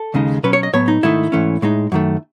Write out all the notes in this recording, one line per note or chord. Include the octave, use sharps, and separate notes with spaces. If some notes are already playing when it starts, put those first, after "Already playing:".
Already playing: A4
D#2 C#3 G#3 D#4
B2 F#3 C#4 B4
C#5
D#5
A2 F#3 B3 C#5
D#4
G#2 D#3 A3 D#4 E4
G#2 E3 A3 C#4
A2 G#3 D#4
F#2 D#3 A3